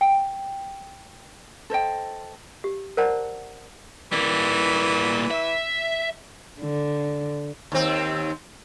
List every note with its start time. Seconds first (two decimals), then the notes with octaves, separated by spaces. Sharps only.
0.01 G5
1.70 A4 C5 D#5 G5
2.64 G4
2.97 A#4 C5 D5 F#5 A5 A#5
4.12 E3 G3 A#3
5.31 E5
6.60 D3
7.72 D#2 C4